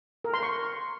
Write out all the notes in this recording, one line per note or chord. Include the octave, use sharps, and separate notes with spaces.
A#4
C6
C#6